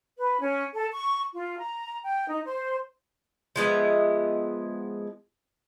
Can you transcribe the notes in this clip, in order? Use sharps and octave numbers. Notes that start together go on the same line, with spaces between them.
B4
C#4
A4
C#6
F4
A#5
G5
D#4
C5
F3 G#3 B3 E5